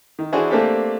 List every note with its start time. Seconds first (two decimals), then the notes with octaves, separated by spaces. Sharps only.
0.19 D#3
0.33 E3 D4 E4 F#4 G#4 C5
0.50 A3 A#3 C4 D4 G4 A4